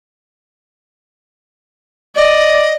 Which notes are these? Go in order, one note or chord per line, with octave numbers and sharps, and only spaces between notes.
D5 D#5